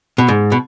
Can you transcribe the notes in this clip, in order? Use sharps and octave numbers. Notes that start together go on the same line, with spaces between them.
B2
G#2
B2